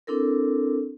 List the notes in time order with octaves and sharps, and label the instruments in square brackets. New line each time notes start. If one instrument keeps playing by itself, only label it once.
[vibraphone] C4 D4 E4 A4 A#4